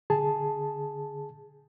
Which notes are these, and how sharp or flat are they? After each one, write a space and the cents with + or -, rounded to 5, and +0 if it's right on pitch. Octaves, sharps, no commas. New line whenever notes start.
D3 -15 G#4 +5 A5 +0